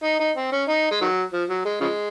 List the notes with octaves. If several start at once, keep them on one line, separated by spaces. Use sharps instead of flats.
D#4
D#4
C4
C#4
D#4
G#3
D#3 F#3
F3
F#3
G#3
C#3 F3 G#3